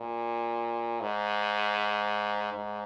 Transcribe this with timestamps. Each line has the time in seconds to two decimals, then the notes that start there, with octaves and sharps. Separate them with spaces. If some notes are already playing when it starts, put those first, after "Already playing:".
Already playing: A#2
1.01 G#2
2.53 G#2